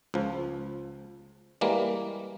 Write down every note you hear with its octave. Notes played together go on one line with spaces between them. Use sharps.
C#2 F3
E3 G3 G#3 A#3